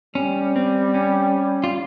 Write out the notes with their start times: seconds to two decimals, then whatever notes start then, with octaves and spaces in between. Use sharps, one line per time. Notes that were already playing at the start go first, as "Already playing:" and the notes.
0.15 G3 C#4
0.56 C4
0.94 C#4
1.64 F4